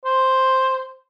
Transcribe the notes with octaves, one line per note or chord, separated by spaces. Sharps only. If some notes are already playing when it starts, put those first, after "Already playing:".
C5